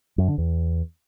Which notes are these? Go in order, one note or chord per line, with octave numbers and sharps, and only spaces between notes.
F#2
D3
E2